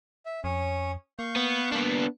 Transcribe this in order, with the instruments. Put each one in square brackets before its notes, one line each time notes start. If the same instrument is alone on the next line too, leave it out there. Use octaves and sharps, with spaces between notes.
[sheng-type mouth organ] E5
[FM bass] F2 [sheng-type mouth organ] C#4 C#5 D#6
[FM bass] A#3 [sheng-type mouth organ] F5 C#6 G6
[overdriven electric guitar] B3
[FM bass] A#3 [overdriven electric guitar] B3 D4